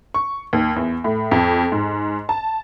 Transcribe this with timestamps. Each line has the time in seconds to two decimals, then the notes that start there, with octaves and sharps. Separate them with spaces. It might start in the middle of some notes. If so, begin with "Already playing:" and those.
0.14 C#6
0.53 D#2
0.76 E2
1.04 A2
1.31 F2
1.72 G#2
2.29 A5